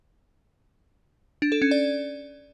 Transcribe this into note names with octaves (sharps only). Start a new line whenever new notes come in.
D4
A4
C#4
D5